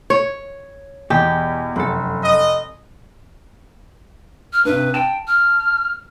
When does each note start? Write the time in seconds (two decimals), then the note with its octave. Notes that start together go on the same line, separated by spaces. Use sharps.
0.10 C#5
1.10 E2 B2 G4
1.76 F1 F#2 A4
2.21 D#5
4.53 F6
4.65 G2 C3 B4
4.94 G5 A5 E7
5.28 F6